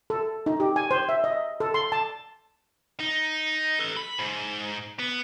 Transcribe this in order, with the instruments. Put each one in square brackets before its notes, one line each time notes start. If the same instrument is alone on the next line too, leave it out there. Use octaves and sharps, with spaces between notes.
[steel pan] A4
D#4
G4
G#5
C5
E5
D#5
A4
C6
A5
[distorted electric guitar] D#4
A4 B4
B5
G#2
B3